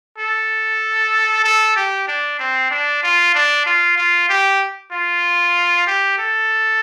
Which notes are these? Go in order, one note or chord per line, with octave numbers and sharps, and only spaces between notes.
A4
A4
G4
D4
C4
D4
F4
D4
F4
F4
G4
F4
G4
A4